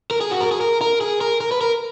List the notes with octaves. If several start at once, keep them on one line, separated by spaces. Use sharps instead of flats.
A#4
G#4
F#4
A#4
G#4
A#4
A#4
G#4
A#4
A#4
B4
A#4